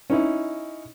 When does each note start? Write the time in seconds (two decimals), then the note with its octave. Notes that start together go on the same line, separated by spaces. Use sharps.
0.10 C#4 D#4 E4